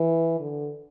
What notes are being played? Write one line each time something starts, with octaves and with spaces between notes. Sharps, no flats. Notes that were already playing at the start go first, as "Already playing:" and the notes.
Already playing: E3
D3